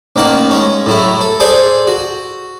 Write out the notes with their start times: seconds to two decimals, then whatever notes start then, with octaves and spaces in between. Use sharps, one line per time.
0.16 A1 D#3 A#3 F#5 A5
0.51 G#3 C#4
0.86 A2 F#3 E4
1.21 A4
1.40 G#4 A4 C5 D5
1.87 F#4